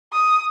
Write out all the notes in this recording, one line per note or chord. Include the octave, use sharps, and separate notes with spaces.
D#6